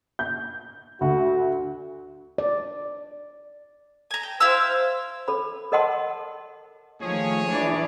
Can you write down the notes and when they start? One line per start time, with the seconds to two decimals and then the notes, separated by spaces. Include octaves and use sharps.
0.19 G6
1.01 D2 F#4
2.38 D5
4.11 G#5 A#5
4.23 G5
4.40 E4 C5 F5 E6
5.28 A4 B5
5.72 A4 A#4 D#5 F#5 A5 C6
7.01 D#3 F3 A3 G#4 C#5
7.49 E3 D4 D5